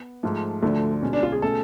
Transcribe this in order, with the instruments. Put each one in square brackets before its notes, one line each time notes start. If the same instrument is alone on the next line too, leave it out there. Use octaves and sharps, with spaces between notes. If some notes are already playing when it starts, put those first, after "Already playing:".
Already playing: [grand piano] B3
[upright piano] G#2 F3 A3
[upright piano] D2 D3 F3 [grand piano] A3
[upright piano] B2 G#3 C#4
[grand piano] D4
F4
G#4
[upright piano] B2 A3 C#4 G#4 [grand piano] A4